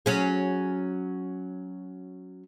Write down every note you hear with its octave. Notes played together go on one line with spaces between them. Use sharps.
F#3 C#4 G#4